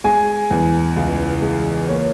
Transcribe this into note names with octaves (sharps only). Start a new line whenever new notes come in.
G#3 G#5
E2
C#2
G#3
A#3 C#5